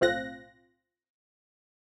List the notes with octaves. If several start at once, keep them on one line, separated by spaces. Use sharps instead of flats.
B1 A2 C4 F4 F#6 A#6